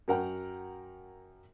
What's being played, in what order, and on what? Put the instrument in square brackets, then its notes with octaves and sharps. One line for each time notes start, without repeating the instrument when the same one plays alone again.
[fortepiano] F#2 A#4 F#5 G5